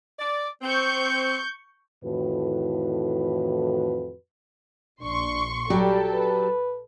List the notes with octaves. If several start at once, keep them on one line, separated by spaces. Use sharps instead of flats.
D5
C4 C#6 G6
F2 A2 D#3 E3 F#4 B4
A#1 D4 C6 C#6
F#3 G3 G4 A4 D5
B4